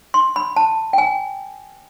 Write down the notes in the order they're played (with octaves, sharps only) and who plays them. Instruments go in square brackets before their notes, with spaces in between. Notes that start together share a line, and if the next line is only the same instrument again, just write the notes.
[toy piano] C6
B5
A5
G5
G#5